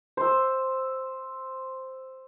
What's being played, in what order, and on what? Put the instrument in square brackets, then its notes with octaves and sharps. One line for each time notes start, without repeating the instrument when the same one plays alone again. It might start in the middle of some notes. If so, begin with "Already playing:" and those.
[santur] C5 E6